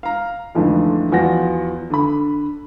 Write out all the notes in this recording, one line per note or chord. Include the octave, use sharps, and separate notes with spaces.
F5 A#5
F2 G#2 D3 E3 F3 A3
E2 F3 F#4 F#5 A#6
D3 B5